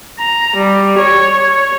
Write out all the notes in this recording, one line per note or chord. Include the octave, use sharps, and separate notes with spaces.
A#5
G3
C#5